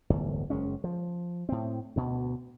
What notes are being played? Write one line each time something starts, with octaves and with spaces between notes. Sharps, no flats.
D1 G1 E2
F#1 G#3 C#4
F3
A2 C4
D2 B2